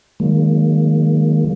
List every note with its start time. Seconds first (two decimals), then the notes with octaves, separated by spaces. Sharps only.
0.20 D#3 F#3 G#3 A#3